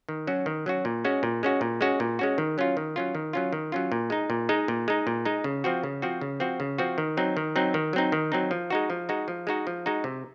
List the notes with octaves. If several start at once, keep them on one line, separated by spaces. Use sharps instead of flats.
D#3
F#3 C#4 F#4
D#3
F#3 C#4 F#4
A#2
G#3 C#4 F#4
A#2
G#3 C#4 F#4
A#2
G#3 C#4 F#4
A#2
G#3 C#4 F#4
D#3
F#3 C#4 F4
D#3
F#3 C#4 F4
D#3
F#3 C#4 F4
D#3
F#3 C#4 F4
A#2
G#3 D#4
A#2
G#3 D#4
A#2
G#3 D#4
A#2
G#3 D#4
C#3
F3 C4 F#4
C#3
F3 C4 F#4
C#3
F3 C4 F#4
C#3
F3 C4 F#4
D#3
F#3 C4 D#4
D#3
F#3 C4 D#4
D#3
F#3 C4 D#4
D#3
F#3 C4 D#4
F3
G#3 D#4 F#4
F3
G#3 D#4 F#4
F3
G#3 D#4 F#4
F3
G#3 D#4 F#4
C3